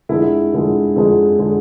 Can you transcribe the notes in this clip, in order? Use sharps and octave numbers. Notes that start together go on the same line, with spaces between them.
F2 D3 G#3 E4
F2 D3 G#3
F2 D3 G#3
D3 G#3